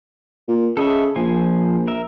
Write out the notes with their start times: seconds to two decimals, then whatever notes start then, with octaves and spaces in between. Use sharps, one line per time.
0.48 A#2
0.77 C#3 A4 D#5 E5
1.16 A#1 F3 C5 G#5
1.88 A#4 E5